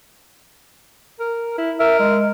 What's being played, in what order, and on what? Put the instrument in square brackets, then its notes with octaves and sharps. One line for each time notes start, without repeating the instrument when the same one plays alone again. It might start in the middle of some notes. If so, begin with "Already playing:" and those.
[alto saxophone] A#4
E4
[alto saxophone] A#4 [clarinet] E5
[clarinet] G#3